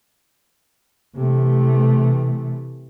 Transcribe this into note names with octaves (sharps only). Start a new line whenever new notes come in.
C3 E3 A3